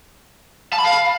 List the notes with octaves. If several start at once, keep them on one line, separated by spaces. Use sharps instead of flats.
A5
B5
F5